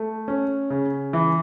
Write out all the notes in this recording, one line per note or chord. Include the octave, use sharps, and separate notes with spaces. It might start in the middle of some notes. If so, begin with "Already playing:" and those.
Already playing: A3
C#4
C#3
E3